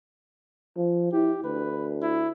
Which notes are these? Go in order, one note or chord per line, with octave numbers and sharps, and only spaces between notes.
F3
E4 G4
D2 B4
E4